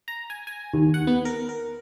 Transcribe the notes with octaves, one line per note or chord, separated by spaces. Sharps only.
A#5
G#5
G#5
D#2
F#5
B3
A#4
A#4